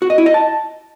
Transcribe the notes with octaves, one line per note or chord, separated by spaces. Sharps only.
F#4
D#5
E4
D#5
A5